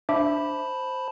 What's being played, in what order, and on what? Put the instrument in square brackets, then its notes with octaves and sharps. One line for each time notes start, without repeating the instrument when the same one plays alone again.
[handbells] D4 E5 D6 [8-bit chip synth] C5 A5 B5